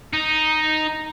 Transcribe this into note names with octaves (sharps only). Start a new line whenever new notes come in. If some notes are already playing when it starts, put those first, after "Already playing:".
D#4